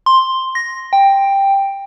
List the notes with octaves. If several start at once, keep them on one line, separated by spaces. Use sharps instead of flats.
C6
A#6
G5